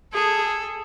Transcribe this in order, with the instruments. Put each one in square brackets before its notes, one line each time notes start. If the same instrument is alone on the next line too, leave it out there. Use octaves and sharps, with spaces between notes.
[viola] G#4 [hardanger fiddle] A4